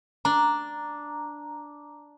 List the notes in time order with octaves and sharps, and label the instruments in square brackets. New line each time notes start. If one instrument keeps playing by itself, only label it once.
[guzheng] D4 [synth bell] A#5